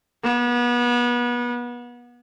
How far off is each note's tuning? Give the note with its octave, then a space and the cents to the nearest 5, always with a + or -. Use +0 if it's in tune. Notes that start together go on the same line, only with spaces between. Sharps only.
B3 -30